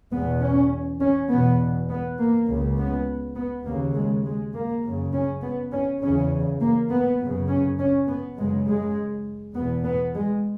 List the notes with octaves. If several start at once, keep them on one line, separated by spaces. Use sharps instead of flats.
E2 B2 B3
C#4
C#4
E2 B2 B3
B3
A#3
C#2 C#3
B3
B3
D#2 C#3 A#3
G#3
G#3
A#3
F#2 C#3
C#4
B3
C#4
E2 C#3 C#4
A#3
B3
F#2 C#3
C#4
C#4
B3
F#2 C#3 G#3
G#3
E2 B2 B3
B3
G#3